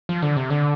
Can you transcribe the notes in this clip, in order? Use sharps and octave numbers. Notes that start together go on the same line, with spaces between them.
F3
D3
C3
D3